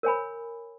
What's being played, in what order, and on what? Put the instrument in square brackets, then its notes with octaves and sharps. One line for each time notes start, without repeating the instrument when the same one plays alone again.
[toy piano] A#4 C#5 G#5 B5